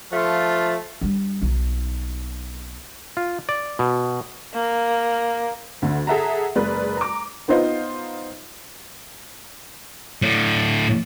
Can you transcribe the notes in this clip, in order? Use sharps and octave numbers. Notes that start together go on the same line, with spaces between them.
F3 A3 F4
G3 D4
B1 D#4
F4
D5
B2
A#3
D2 D3
G#4 A4 E5 F#5 A#5
F#1 G#3 A#4 B4 D5
A#5 D6
B3 D#4 F4 C5 D#5
A2 D3